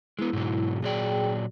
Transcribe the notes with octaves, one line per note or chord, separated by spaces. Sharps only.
G#3 B3 E4
G#2 B2 F#3
A#2 F#3 G#4 D5 G5